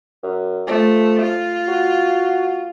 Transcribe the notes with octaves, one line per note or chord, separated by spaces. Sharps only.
F#2
F3 A3
F4
F#4